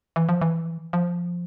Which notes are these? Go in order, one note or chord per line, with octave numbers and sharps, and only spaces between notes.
E3
F3
E3
F3